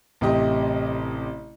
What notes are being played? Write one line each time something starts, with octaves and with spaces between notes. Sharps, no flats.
A1 C3 G4 D#5